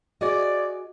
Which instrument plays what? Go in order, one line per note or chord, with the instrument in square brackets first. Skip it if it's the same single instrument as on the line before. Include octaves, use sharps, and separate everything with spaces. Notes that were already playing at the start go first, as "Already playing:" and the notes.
[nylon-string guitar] F#4 G#4 D#5 [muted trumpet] D5